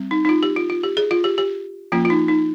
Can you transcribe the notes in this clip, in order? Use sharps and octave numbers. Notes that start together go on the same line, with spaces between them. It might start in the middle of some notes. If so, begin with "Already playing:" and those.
Already playing: G3 C4
D#4
D#4
F4
G4
F4
F4
G4
G#4
F4
G4
G4
F3 A#3 C#4 F4
F4
D#4
D#4